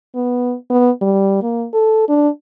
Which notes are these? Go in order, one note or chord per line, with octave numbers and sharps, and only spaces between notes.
B3
B3
G3
A#3
A4
D4